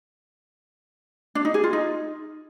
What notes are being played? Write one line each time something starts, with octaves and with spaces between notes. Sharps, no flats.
D4
D#4
G#4
F4
D#4